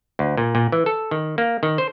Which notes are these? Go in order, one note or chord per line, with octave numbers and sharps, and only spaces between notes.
D2
A#2
A#2
E3
A4
D#3
A#3
D#3
C5